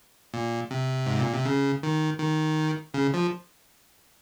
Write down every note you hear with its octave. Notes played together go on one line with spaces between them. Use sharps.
A#2
C3
G#2
A#2
C3
C#3
D#3
D#3
C#3
F3